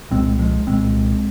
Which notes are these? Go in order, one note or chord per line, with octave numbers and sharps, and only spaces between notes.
C2 A#2 G#3 C4
F3 G#3
C2 A#2 G#3 C4